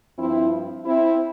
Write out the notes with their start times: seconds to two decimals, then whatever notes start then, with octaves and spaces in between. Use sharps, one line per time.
0.18 G2 F3 C4 E4
0.85 C4 E4